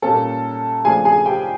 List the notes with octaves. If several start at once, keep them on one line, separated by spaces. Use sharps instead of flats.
A#2 G3 A#3 C#4 A4 A5
C#3 F3 A3 D4 F4 G#4 G#5
G#4 G#5
G4 G5